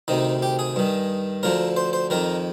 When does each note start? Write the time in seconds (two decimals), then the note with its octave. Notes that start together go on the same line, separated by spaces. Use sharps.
0.08 D2 C3 D#3 D#4
0.42 G4
0.59 G#4
0.76 G2 D#3
1.43 D2 D3 F3 A#4
1.77 C5
1.93 C5
2.10 F2 D#3 A#4